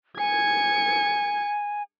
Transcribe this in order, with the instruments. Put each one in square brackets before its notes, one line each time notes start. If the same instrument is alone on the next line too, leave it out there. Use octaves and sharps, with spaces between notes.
[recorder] G#5 [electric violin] G#6 C#7